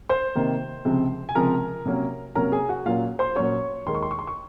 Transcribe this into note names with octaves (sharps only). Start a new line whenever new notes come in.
C5 C6
C3 D#3 A#3
C#2 C3 F3 G#3 C4
G#5
C#2 C3 F3 G#3 C4 A#4 A#5
C3 F#3 A#3 C#4
C3 F#3 A#3 C#4 A#4 A#5
G#4 G#5
F#4 F#5
A#2 F#3 A#3 C#4 F4 F5
C5 C6
A#2 F#3 A#3 C#4 C#5 C#6
D#2 D#3 G#3 C6
C#6
C6
C#6
C6
C#6